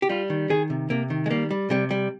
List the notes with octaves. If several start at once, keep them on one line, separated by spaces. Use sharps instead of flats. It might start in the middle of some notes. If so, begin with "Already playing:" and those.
G4
G3 F4
D#3
D#3 G#4
C3
C3 A#3
D#3
G#3
G3 A#3
G3
C3 G3
G3